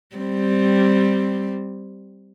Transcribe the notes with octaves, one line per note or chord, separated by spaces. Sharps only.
G3 C4